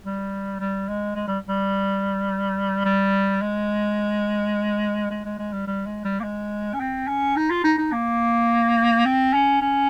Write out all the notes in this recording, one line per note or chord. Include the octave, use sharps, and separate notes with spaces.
G3
G3
G#3
G#3
G3
G3
G3
G#3
G#3
G#3
G#3
G3
G3
G#3
G3
A#3
G#3
C#4
C4
C#4
D#4
F4
D#4
D#4
A#3
C4
C#4
C#4